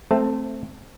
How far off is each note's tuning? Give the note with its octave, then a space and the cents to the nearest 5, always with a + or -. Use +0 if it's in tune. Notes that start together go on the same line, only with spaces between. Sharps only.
A3 +0 C4 +0 A5 +10